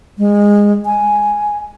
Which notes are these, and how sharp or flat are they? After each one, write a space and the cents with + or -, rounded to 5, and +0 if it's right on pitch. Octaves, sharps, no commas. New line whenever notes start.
G#3 -20
G#5 +5